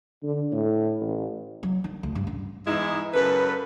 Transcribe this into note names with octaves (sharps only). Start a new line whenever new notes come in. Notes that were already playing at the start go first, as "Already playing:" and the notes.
D3
A2
A1
F#3
D#3
D2
G2
A1
E2 G#2 E3 G#3 D#4 E4
F#2 C#3 A4 B4